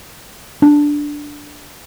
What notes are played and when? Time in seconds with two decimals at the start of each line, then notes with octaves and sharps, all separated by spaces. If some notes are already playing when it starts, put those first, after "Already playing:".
0.62 D4